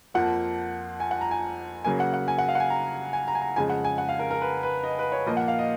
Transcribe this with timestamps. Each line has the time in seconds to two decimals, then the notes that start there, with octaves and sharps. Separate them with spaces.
0.14 F2 F3 A#3 F#5
1.00 G#5
1.11 F#5
1.21 A#5
1.31 G#5
1.84 C#3 F#3 A#3 G#5
2.00 F#5
2.14 F#5
2.28 G#5
2.38 F#5
2.49 F5
2.55 F#5
2.60 G#5
2.70 A#5
3.13 G#5
3.28 A#5
3.35 G#5
3.41 A#5
3.56 F2 C#3 G#3 G#5
3.69 F#5
3.84 G#5
3.98 F#5
4.09 F5
4.19 A#4
4.31 A#4
4.41 B4
4.63 B4
4.83 D#5
4.99 B4
5.12 C#5
5.26 A#2 F3 A#3 D#5
5.37 F#5
5.48 F5
5.59 D#5